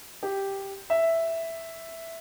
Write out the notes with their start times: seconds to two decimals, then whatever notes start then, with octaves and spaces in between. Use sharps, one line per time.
0.23 G4
0.90 E5